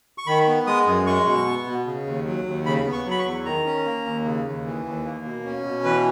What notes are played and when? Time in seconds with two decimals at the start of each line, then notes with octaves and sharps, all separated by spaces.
0.18 C#6
0.27 D#3 B5
0.47 B3
0.67 G#3 D#6
0.87 F#2
1.07 G#3 C#6
1.26 B2
1.46 B3
1.67 B2
1.86 C#3
2.06 D#2
2.26 F#3
2.46 D#2
2.66 C#3 B5
2.86 B3
2.93 C#6
3.06 F#3 B5
3.19 C#6
3.26 E2
3.46 D#3 A#5
3.66 C#4
3.86 A#3
4.06 D#2
4.25 C#3
4.45 D#2
4.65 E3
4.85 D#2
5.05 A#3
5.24 B2
5.45 C#4
5.65 B2
5.84 E3 B4